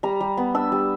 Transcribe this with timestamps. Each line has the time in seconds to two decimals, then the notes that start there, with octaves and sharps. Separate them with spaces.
0.03 G3 A#5
0.21 G3
0.37 B3
0.54 D4 E6
0.72 G3